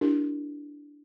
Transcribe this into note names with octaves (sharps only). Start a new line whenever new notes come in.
D4 E4 G4 A#4